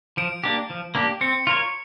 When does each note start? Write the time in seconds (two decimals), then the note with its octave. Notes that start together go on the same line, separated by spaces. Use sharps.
0.17 F3 D7
0.44 A#3 D4 G4
0.70 F3
0.95 A#3 D4 G4
1.21 C4 C#7
1.47 F4 A#4 C#5